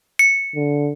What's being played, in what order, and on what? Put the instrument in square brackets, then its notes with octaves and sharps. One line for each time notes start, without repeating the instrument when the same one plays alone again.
[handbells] C#7
[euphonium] D3